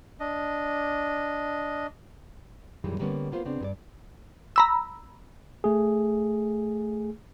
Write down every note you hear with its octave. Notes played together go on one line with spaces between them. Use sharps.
D4 D#5
F#2 A#2 D#3 E3 G3 G#3
D3 G3 A#3 B3 C#4
A#3 B3 F4 C5
C#3 B3 C4 D4
G2 G4 D5
A#5 B5 E6
A3 G#4